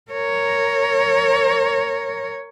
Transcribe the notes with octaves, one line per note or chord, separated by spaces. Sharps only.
A#4 C#5